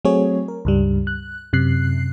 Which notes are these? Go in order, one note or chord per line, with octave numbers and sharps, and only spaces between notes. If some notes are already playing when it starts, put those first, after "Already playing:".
F#3 A3 C4 F#4 G#4 C#5
A#4
C#2 G2 G3
F#6
F#2 C3 F#6 C7